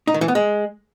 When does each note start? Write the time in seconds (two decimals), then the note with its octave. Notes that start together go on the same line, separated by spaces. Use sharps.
0.07 D#4
0.14 D#3
0.21 E3
0.28 B3
0.35 G#3